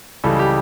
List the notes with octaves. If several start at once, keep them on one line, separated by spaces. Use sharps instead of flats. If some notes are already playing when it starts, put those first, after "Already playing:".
C#2 C#3 E3 G3 A4
G4